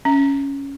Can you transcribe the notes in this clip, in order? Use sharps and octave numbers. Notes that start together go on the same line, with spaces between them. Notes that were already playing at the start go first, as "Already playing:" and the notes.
C#4